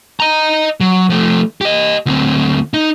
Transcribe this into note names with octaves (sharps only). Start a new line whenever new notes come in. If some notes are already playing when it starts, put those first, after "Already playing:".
D#5 A#5
F#3
F3 A3
G4 D#5
D2 C4
D#4